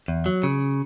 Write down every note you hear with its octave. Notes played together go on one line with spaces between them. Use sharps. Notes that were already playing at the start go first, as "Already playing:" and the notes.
E2
F#3
C#3